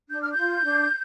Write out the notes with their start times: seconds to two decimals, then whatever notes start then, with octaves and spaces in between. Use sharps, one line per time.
0.10 D4 G6
0.21 F6
0.32 F4 G6
0.65 D4